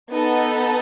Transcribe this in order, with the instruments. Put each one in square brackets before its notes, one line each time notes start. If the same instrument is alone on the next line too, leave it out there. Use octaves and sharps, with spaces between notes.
[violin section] B3 D#4 A4